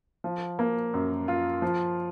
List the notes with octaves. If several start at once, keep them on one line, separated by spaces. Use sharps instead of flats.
F3
A#3
F#2
F4
F3